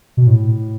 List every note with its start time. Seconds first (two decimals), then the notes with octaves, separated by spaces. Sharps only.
0.17 B2
0.27 A2